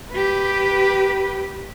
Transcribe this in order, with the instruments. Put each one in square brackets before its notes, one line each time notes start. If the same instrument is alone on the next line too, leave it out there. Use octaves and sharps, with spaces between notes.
[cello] G4 B4